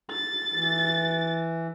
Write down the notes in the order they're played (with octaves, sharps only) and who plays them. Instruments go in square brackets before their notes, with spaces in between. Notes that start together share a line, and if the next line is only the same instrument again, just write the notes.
[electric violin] A6
[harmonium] E3